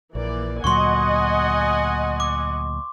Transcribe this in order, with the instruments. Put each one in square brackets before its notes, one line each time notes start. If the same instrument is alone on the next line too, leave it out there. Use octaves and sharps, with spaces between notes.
[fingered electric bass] A#1 [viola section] E3 A#3 D5
[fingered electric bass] D2 A#2 F#3 [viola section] D#5 F#5 G#5 [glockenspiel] C6 C#6
[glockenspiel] D6